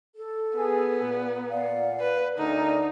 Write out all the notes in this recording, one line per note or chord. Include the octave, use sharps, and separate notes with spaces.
A4
B3 G#4
A#2
D5 F5 F#5
B4
D2 D3 D#4 A#4 D5